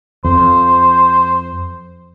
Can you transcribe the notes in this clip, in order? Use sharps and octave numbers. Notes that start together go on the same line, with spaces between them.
F2 C5